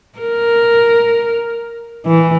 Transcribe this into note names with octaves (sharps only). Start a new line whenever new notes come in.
A#4
E3